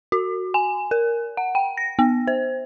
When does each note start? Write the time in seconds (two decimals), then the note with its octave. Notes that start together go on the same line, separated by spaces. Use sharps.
0.12 F#4
0.54 G#5
0.91 A#4
1.37 F#5
1.55 G5
1.77 A#6
1.99 B3
2.27 C5